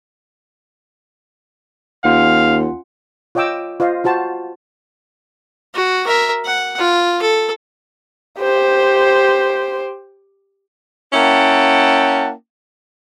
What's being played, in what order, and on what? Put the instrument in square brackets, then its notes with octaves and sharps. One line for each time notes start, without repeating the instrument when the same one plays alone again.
[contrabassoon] D#2 [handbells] C#4 F4 F#5 [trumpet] F5
[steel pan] F4 C#5 D#5 G5 D6 E6
F4 C5 D#5 F5
F4 F#4 C5 A5
[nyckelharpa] F#4
A#4 E5
F#5
F4
A4
[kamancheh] G4 C5
[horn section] A#3 C#4 E4 F#5 G5 A5